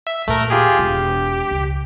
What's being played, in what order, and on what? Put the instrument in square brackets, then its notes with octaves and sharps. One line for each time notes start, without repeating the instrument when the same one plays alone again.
[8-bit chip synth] E5
[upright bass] D#2 A#2 [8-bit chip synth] A3 A#4
[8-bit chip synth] F4 G4 G#4
[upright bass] E1 [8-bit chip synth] G4
[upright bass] C#2